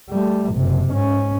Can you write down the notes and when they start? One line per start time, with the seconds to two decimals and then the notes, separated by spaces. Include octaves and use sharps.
0.10 G3 A3
0.54 F#1 C3
0.91 G#2 C#4